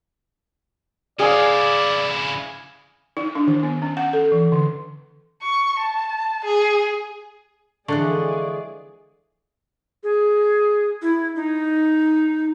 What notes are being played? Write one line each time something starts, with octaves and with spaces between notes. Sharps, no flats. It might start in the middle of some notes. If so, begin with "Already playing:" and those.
C#3 E4 G#4 D5 F5
D#4
D4
D#3
B3
C#4
F#5
A4
E3
D3
C#6
A5
G#4
D3 E3 F3 G#3 G#4 D5 C#6 F#6
G#4
E4
D#4